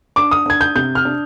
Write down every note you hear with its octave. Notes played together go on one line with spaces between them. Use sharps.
D4 D6
D#6
D4 G#6
G6
C3 G6
F6
D4